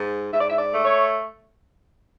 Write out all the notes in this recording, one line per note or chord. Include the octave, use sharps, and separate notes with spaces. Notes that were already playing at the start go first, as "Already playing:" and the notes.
Already playing: G#2
G#2 E5
D5
E5
D5
A3
C#5